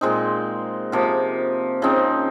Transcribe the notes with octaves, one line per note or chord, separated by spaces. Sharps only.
A#2 G#3 C4 D#4
C3 F3 A#3
C#3 F3 C4 D#4